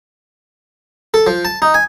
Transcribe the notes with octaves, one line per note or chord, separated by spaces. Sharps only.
A4
F3
A5
D#4
G#5